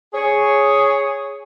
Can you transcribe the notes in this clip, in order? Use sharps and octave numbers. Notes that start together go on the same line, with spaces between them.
G#4 C#5